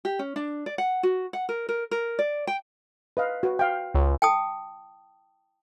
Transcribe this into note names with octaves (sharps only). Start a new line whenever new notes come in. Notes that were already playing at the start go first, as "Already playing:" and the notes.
G4
C#4
D4
D5
F#5
F#4
F#5
A#4
A#4
A#4
D5
G5
B4 D#5 F5
F#4 B4
F5 G5
C#2
G5 A5 D#6